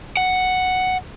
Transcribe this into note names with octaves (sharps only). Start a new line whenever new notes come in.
F#5